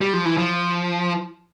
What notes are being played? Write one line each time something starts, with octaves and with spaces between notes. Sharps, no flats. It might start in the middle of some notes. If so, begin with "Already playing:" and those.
G3
F3
E3
F3